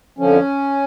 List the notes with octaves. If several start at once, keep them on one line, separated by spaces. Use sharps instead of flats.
F2 D3 F3 C#4